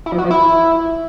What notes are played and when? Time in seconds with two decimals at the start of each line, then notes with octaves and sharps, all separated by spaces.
0.06 E4
0.12 F3
0.18 F#4
0.24 F3
0.31 E4